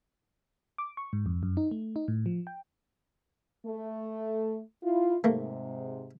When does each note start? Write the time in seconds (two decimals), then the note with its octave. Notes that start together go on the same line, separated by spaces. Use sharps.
0.78 D6
0.97 C#6
1.13 G#2
1.26 F2
1.43 F#2
1.57 D#4
1.71 A3
1.96 D#4
2.08 A2
2.26 F3
2.47 G5
3.65 A3
4.84 E4 F4
5.24 G#2 C3 A3 A#3